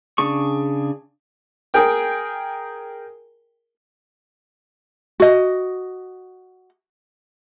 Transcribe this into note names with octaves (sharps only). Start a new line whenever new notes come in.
C#3 D4 G#4 C#6
G#4 A#4 G5 D#6
F#4 D#5